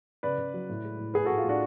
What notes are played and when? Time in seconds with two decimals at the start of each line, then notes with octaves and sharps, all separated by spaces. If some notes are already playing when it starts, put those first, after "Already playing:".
0.23 C#3 B4 D5
0.38 C#3
0.54 F#3
0.69 A2
0.85 G#3
0.99 A2
1.14 A2 G#4 B4
1.25 F#4 A4
1.30 A2
1.38 F4
1.44 A2 D4 F#4